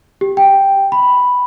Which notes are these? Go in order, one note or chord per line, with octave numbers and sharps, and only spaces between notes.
G4
G5
B5